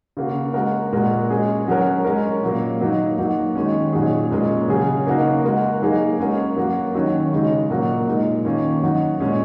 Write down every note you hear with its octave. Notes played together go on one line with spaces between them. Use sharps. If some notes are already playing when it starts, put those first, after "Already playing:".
C#3 A#3 F#4
G#3 F#4 A#4
A#2 G#3 F#4 A#4
G#3 C#4 G#4
F#3 C#4 F#4 A#4
G#3 C#4 A#4
A#2 F#3 A#3
F#3 A#3 D#4
F#3 A#3 D#4 F#4
D#3 G#3 C#4
A#2 F#3 D#4 G#4
A#2 G#3 C#4 A#4
C#3 F#3 C#4 G#4
C#3 A#3 D#4 F#4 A#4
G#3 F#4 A#4
F#3 A#3 D#4 G#4
G#3 C#4 F#4 A#4
F#3 A#3 F#4
D#3 F#3 C#4
C#3 G#3 D#4
A#2 F#3 A#3 F#4 A#4
A#2 G#3 D#4
D#3 A#3 C#4
F#3 D#4 F#4
A#2 G#3 C#4 G#4